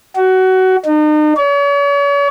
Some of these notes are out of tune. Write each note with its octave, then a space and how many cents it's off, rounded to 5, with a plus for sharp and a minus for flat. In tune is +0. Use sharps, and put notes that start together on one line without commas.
F#4 +20
D#4 -40
C#5 +40